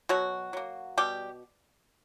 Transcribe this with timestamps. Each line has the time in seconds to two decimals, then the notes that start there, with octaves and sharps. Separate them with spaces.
0.09 B2 F#3 F#4
0.53 F#3 A#3
0.98 B2 G3 G4